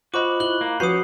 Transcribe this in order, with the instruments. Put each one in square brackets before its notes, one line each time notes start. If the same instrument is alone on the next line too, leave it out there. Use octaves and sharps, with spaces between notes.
[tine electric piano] F4 C5 D#5 [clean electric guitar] F#4 [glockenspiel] B5 D6
[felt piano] E4 [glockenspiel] F#6 F#7 G7
[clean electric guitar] A#3
[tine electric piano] F3 G6 [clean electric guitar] C#4 [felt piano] F#4 B4 [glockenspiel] D#6 C7